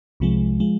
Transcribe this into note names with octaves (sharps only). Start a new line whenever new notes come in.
C2 C3 F3 G#3
F3 G#3